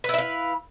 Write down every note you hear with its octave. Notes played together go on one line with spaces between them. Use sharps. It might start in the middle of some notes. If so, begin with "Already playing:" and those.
E4 B4 E5 F5